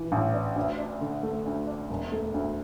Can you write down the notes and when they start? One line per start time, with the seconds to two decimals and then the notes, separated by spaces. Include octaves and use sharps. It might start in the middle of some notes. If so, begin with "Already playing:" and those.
Already playing: E3
0.12 A1
0.34 D4
0.56 D2
0.78 D4
1.01 D3
1.23 A3
1.46 D2
1.67 D4
1.89 E1
2.12 A3
2.34 D2